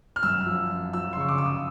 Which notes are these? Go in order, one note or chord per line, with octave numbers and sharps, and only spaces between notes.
F6
F#2 E6
F3
F#2
F3 E6
C6
C#3 C#6
D6
C#3 E6
D#6